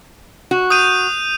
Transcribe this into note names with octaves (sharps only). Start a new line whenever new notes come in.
F#4
D#6 G6 D#7